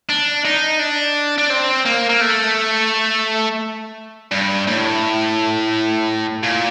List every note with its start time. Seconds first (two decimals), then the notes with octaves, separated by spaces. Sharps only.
0.09 D4
0.45 D#4
0.79 D4
1.38 D4
1.50 C4
1.85 A#3
2.10 A#3
2.21 A3
4.32 G2
4.67 A2
6.43 A#2